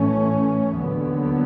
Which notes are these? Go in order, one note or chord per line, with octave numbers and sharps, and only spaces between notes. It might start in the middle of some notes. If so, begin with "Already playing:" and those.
Already playing: A2 E3 A3 C#4
D#2 D3 F#3 B3